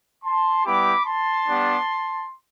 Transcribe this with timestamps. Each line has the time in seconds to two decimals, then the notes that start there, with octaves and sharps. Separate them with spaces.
0.24 A5 C6
0.65 G3 B3 E4 G4 B5 D6
1.06 A5 C6
1.47 G3 B3 D4